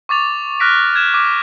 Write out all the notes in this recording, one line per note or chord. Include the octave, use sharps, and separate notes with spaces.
C#6 D6 A6 F7
F6 F#6 A#6 B6 D7
F6 F#6 G#6 E7
D6 D#7